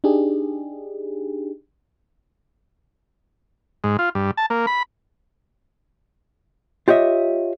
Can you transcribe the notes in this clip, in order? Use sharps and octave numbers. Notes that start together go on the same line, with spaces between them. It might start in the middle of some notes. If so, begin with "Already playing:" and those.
D4 D#4 G4 G#4
G#2
F4
G2
A5
A#3
B5
F4 G4 C#5 D#5 E5